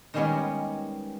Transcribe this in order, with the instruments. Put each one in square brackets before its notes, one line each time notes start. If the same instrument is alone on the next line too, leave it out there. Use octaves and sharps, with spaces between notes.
[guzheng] D#3 G3 G#3 B3 C#4 G4